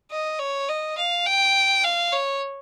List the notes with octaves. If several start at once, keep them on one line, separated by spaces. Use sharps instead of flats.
D#5
C#5
D#5
F5
G5
F5
C#5